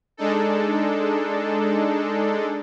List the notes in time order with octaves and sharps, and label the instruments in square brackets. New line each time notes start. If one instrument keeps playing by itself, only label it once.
[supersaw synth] G#3 D4 D#4 A4